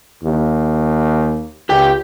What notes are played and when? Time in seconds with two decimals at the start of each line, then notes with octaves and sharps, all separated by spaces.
0.23 D#2
1.69 C#2 G4 G5